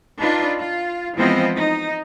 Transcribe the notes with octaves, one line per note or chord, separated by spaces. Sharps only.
D4 D#4 F4 B4
F4
E3 F3 G#3 B3 C4 D#5
D#4